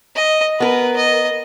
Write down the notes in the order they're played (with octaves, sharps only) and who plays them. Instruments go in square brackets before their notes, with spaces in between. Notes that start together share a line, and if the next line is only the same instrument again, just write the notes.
[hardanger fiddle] D#5
[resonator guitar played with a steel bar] B3 A#4 [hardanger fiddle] B4
[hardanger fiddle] D#5